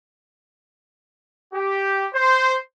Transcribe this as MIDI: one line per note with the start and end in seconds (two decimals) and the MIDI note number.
1.53 2.06 67
2.14 2.55 72